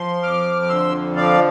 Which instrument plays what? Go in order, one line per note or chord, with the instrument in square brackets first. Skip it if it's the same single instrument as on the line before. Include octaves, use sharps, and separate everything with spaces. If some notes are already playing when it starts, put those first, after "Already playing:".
Already playing: [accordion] F3 C6
F2 D6 F6
D6
D3 C6 E6
F3 D5 F5